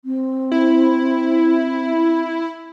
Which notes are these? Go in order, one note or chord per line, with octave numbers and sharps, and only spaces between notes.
C4
E4